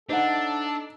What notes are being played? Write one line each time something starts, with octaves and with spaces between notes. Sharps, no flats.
D4 D#4 A4 C5 E5 F#5